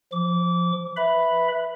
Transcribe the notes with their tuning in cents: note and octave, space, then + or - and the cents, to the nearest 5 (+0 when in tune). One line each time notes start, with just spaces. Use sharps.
F3 +0 D6 -25
B4 -5 E5 +0 B5 +0